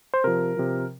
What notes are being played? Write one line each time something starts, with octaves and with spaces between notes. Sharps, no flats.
C5
C3 F3 A#4
C3 F3